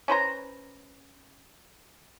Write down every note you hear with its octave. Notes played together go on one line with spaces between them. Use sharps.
C#4 B4 C5 A#5